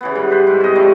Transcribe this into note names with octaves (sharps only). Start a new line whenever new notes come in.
C#3 E3 B3
G2
B4 C5
G#2
C3 D#5
F3 G3 A3